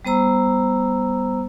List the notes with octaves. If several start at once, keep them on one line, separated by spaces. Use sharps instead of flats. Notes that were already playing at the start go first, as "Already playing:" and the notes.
G3 B3 C5 A#5 E6